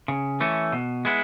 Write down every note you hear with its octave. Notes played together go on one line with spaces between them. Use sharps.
C#3
E3 A3 C#4
B2
G#3 B3 E4